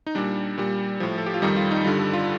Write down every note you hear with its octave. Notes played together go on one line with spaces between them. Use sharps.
D#4
A#2 G3 D4
A#2 G3
A2 F3
A4
G4
F4
F2 D#3 G3 D#4
F4
D#4
G2 D3 G3 F4
A4
F4